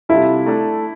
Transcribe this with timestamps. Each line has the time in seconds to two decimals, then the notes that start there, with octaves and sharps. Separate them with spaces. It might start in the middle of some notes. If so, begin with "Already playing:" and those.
0.09 C3 G3 D4 E4 F4 A4
0.46 A3 D4 A4